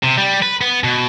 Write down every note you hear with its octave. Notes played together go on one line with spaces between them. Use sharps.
C3
G3
B4
B3
B2